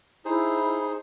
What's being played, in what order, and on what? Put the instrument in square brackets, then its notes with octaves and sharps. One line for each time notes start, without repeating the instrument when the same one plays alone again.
[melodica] D#4 G#4 C5 [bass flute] E4